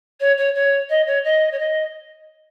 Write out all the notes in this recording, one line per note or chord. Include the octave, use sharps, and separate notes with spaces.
C#5
C#5
C#5
D#5
C#5
D#5
C#5
D#5